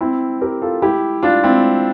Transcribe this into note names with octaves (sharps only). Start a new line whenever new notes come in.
C4 E4
G4 A#4
F4 A4
E4 G4
D4 F4
C4 E4